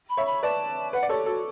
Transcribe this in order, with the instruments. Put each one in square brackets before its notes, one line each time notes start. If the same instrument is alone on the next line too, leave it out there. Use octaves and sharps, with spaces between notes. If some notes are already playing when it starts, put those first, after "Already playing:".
[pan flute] B5
[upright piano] C#5 E5
[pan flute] B5
[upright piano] B4 D5 [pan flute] A5
[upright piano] B4 [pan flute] F#5
[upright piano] D5
[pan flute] G4 [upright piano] A4 C#5
[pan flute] F#4 [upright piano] A4